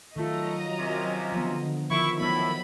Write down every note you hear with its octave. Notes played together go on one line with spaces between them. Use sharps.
D#3 F#3 A3 F4 D#5 A#5
C3 A#3 C#4
D3 F3 B3
D#3 F3 E4 A#4 E5 C#6
A2 F#3 B3 E4 B5